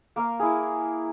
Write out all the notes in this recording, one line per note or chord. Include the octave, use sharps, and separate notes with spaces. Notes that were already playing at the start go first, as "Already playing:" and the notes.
A#3 A#4 F5
E4 G#4